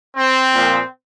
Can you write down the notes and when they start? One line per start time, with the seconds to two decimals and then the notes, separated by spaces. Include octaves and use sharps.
0.16 C4
0.54 A#2 F3